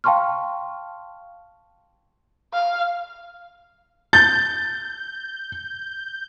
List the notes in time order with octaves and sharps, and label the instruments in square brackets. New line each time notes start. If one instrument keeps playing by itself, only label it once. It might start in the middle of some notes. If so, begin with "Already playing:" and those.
[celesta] F5 G5 A5 C6 C#6 F6
[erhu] F5
[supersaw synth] G6 [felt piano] A6